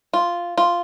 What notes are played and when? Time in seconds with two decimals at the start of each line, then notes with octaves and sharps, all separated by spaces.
0.13 F4
0.57 F4